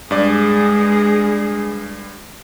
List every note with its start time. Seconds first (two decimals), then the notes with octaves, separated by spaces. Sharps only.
0.11 G2 G#3 G#4 D5